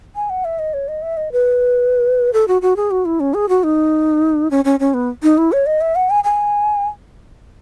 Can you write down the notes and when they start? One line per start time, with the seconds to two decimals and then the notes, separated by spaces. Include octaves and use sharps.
0.15 G#5
0.30 F#5
0.45 E5
0.59 D#5
0.74 C#5
0.88 D#5
1.02 E5
1.17 D#5
1.32 B4
2.33 A4
2.48 F#4
2.62 F#4
2.76 G#4
2.91 F#4
3.05 E4
3.20 C#4
3.34 G#4
3.49 F#4
3.64 D#4
4.51 C#4
4.65 C#4
4.80 C#4
4.94 B3
5.23 D#4
5.38 E4
5.52 C#5
5.66 D#5
5.81 E5
5.96 F#5
6.10 G#5
6.24 G#5